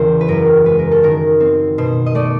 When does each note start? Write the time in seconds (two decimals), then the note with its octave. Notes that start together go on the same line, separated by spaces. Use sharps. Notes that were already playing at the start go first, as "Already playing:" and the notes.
Already playing: E2 C#3 E3 A#4 C5
0.21 B4
0.28 F#2 A#4
0.66 G#3 B4
0.79 A#4
0.91 A4
1.03 D#3 A#4
1.40 C4
1.78 B2 C5
2.06 D#5
2.15 A3 D5